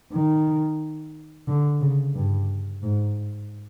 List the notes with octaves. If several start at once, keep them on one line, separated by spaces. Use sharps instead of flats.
D#3
D3
C#3
G2
G#2